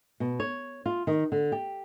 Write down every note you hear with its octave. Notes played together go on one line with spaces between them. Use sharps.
B2
C#5
F4
D#3
D3
G4